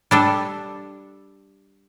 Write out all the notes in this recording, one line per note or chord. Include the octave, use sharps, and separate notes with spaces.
G3 D4 A4